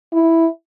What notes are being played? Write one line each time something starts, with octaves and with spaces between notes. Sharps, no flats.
E4